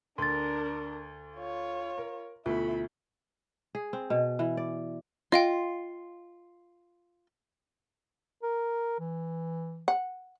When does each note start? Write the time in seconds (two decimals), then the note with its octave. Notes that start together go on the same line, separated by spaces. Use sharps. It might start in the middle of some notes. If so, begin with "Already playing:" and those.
0.18 D2 D4 A#4 C6 A6
1.37 F4 C#5
1.98 A#4
2.46 D2 B2 A3 E4 F4 B5
3.75 G#4
3.93 C4
4.10 B2
4.39 E3
4.57 D5
5.32 F4 D#5 F5 G5
8.43 A#4
9.00 E3
9.88 F#5